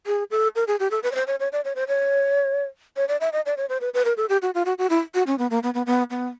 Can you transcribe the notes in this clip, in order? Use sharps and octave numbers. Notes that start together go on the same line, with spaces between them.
G#4
A4
A#4
G#4
G4
A4
B4
C#5
C5
C#5
C#5
D5
C#5
C5
C#5
C#5
D5
E5
D#5
D5
C#5
C5
B4
B4
A#4
A4
G4
F#4
F4
F#4
F#4
E4
F#4
C#4
B3
A#3
B3
B3
B3
B3